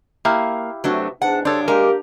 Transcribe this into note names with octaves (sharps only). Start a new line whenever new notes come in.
A#3 E4 G4 F5
C3 F#3 A3 B3 D4 F#4
E2 G#2 D4 F#5
G2 C#3 D4 A4 C5 C#5
G#3 A#3 G4 A#4